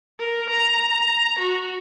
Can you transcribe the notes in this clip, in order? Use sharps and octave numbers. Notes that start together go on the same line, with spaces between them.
A#4
A#5
F#4